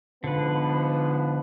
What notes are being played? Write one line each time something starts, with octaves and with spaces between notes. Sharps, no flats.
G#2 D3 F3 B3 B4